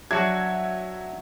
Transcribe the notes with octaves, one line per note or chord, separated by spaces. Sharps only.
F#3 D4 F#4 E5 G#6